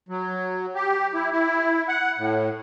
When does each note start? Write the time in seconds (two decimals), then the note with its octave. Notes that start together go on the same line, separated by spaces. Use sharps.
0.09 F#3
0.75 G4
1.14 E4
1.32 E4
1.89 F#5
2.18 A2